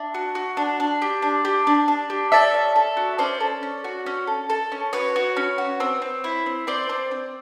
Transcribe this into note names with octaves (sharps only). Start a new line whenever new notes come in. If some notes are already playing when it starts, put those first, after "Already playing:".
Already playing: D4 E5
F#4
F#4
D4
D4
G4
D4
G4
D4
D4
G4
A4 D5 E5
C#4
A4
F#4
C#4 C5 D5
A4
C#4
F#4
C#4
A4
A4
C#4
F#4 B4 C#5
F#4
C#4
F#4
C4
C4
E4
C4
C4 C5 D5
C4
C4